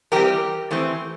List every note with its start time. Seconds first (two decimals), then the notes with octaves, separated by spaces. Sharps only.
0.12 E3 G3 C4 G4 A#4
0.71 E3 A3 C4